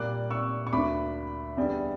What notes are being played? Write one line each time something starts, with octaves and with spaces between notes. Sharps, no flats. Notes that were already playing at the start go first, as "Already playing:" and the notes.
Already playing: A#2 G3 A#3 D6 F#6
C#6 E6
C#6
D2 D3 A#3 B5 D6
E2 D3 G3